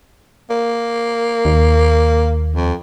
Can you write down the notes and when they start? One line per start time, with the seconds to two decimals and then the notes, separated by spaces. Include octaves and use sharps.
0.50 A#3
1.45 D#2
2.55 F2